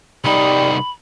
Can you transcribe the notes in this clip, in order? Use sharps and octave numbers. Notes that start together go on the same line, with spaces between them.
C2 G3 D#4 B5